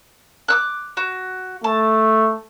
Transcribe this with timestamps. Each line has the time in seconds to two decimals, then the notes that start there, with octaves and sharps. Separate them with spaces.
0.48 D6 E6 F#6
0.97 F#4
1.64 A3 A5